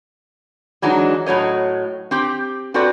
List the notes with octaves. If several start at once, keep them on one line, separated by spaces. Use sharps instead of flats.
E3 F#3 G#3 D4 D#4
A2 F#3 C#5 D#5
C4 G4
C4 F#4 A4 B4 D5